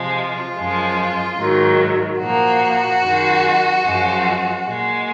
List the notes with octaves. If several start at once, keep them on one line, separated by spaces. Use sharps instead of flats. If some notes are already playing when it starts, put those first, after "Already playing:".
Already playing: C3 F3 G#3
F4
F#2 F3 G#3
G#2 D#3 F#3
A#2 F3 A#3 F#4
F#2 D#3 G#3
F#2 F3 G#3
A#2 G#3